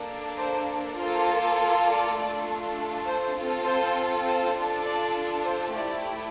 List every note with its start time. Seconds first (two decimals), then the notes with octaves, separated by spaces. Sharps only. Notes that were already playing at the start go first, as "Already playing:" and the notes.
Already playing: A#3 D4 A4
0.37 C5
0.97 A#3 F4 A4 C5
1.86 D5
2.16 A3 D4 F4 A4
3.05 C5
3.35 C4 F4 A4
3.65 C5
4.25 C5
4.55 D4 F4 A4
4.85 D5
5.44 C5
5.74 A3 E4 G4 D5